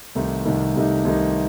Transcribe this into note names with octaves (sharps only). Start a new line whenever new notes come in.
C2 C3 D#3 A3 D#4
C2 C3 D#3 A3 D#4
C2 C3 D#3 A3 D#4
C2 C3 D#3 A3 D#4